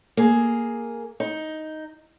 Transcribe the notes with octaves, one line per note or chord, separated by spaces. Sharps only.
A#3 G#4
D#4